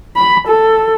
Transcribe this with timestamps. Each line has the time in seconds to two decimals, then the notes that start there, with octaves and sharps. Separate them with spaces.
0.16 B5
0.47 A4